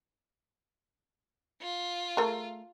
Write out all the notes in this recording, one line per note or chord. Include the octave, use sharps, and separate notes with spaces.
F4
A3 G#4 A#4